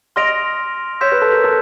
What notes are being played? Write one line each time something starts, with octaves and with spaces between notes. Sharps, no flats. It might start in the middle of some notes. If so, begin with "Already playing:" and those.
D#5 C6 F6 A#6 D7 F7
C#5 C6 E6 G6 B6 E7
B4
A4
A#4
A4